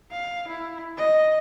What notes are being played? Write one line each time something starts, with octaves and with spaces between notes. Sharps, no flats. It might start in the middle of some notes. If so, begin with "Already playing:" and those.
F5
E4
D#5